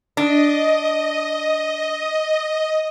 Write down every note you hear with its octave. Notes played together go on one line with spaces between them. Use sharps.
D4 D#5